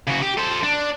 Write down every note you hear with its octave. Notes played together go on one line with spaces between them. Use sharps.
C#3 F#4
G4
A4 C5
D4